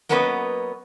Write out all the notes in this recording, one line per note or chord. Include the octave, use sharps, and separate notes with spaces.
F#3 A#3 B3 C#4 B4 D#5